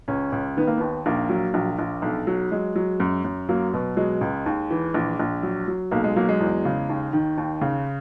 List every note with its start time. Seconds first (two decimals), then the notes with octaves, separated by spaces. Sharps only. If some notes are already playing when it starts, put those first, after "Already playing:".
0.08 C#2 C#4
0.32 C#2
0.57 D#3 B3
0.67 A#3
0.77 D#2 B3
1.06 A#1 A#3
1.29 F#3
1.54 A#1
1.79 A#1
2.02 B1
2.27 F#3
2.52 F#3 G#3
2.76 F#3
3.00 F#2
3.24 F#2
3.49 F#3 A#3
3.74 B2
3.97 F#3 G#3
4.21 C#2
4.46 D#2
4.71 E3
4.94 A#1
5.19 A#1
5.43 F#3
5.68 F#3
5.91 B1 A#3
6.04 G#3
6.16 F#3 A#3
6.29 G#3
6.40 E2
6.65 C#3
6.89 D#2
7.13 D#3
7.38 D#2
7.62 C#3